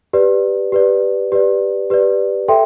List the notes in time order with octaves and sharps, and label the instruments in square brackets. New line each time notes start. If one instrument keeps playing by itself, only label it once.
[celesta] G4 B4 D5
G4 B4 D5
G4 B4 D5
G4 B4 D5
A4 E5 G5 C6